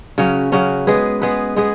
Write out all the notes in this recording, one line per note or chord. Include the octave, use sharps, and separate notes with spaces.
C#3 F#3 C#4 F#4
C#3 F#3 C#4 F#4
G#3 B3 G#4 B4
G#3 B3 G#4 B4
G#3 B3 G#4 B4